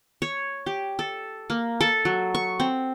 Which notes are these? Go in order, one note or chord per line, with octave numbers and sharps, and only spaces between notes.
C#5
G4
A4
A#3
A4
F#3
C#6
C4